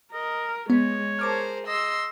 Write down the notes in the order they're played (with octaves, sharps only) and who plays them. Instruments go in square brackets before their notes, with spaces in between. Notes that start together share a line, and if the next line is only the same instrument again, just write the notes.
[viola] A#4 [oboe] D#5
[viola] G#3 [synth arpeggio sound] B3 [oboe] C#5
[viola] G#4 [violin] A#4 C5 [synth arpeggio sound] A5 D6 F6
[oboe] D#5 [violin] C6 E6